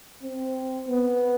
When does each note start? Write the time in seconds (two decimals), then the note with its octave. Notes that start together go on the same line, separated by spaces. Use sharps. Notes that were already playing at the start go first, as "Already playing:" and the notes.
0.23 C4
0.88 B3